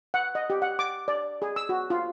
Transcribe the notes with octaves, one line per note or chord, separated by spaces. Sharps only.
F#5
D#5
G4
F#5
D6
D5
G#4
E6
F#4
F4